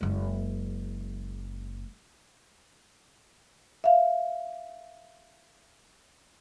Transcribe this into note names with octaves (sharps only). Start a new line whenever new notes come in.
F#1 G#3
E5 F5